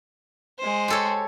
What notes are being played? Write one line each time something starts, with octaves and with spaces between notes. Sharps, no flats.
G#3 C5
G4 A4 C#5